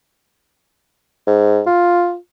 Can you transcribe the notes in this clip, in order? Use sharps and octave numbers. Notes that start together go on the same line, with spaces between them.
G#2
F4